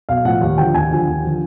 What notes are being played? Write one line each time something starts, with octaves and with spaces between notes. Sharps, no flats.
B1 F5
A2 F3 F#5
D#2
D3 F3 G5
D#2 G#5
D3 F3
D#2
D3 F3